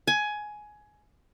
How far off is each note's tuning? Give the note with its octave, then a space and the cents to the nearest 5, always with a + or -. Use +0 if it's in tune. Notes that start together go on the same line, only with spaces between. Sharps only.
G#5 +15